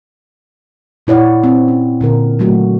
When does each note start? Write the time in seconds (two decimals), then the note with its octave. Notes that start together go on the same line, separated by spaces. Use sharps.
1.07 A#2 E4 C#5 D5 F#5
1.44 C4
1.68 C#4
2.01 A#2 D3 A#4
2.39 C#3 F#3 A3 F#4